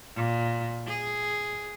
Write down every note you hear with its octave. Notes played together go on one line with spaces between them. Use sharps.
A#2
G#4